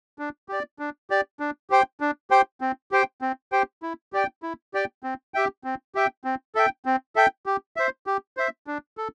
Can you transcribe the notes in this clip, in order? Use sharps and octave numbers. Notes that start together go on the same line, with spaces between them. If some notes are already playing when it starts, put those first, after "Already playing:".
D4
G4 D5
D4
G4 D5
D4
G4 C5 G5
D4
G4 C5 G5
C4
G4 C5 G5
C4
G4 C5 G5
E4
G4 D5 G5
E4
G4 D5 G5
C4
G4 E5 G5
C4
G4 E5 G5
C4
A4 E5 G5
C4
A4 E5 G5
G4
C5 E5
G4
C5 E5
D4
A4